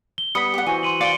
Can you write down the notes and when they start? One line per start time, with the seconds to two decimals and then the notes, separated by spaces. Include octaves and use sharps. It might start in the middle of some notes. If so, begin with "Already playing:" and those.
0.18 G7
0.35 G3 B3 B5 D#6 B6 C#7
0.54 G4 F#5
0.66 E3 F#4 C5 G#5
0.83 C6 D#7 F#7
1.01 D5 F5 D6 C#7 D7 G7